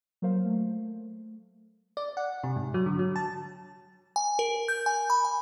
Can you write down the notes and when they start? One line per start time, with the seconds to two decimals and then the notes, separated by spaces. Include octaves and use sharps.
0.22 F#3 A#3 A#4 C5 F5
0.46 A3
1.97 D5
2.17 F#5
2.44 C3
2.56 G#2
2.74 F#3
2.86 D3
2.99 F#3
3.16 A5
4.16 G#5
4.39 A#4
4.68 G6
4.86 G#5
5.10 B5
5.25 G#5